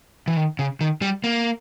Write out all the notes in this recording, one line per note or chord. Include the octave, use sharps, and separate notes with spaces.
E3
D#3
C#3
D#3
G3
A#3